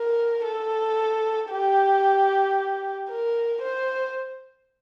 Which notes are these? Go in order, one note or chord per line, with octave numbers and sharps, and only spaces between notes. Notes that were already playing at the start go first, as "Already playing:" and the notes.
Already playing: A#4
A4
G4
A#4
C5